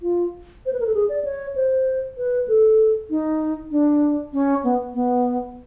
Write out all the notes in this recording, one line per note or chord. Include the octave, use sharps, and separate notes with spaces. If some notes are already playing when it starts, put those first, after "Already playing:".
F4
C5
B4
A#4
A4
G#4
D5
C#5
C5
B4
A4
D#4
D4
C#4
B3
B3